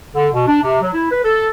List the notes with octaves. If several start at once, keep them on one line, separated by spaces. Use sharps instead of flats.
D3
B2
D4
C3
F#3
E4
B4
A4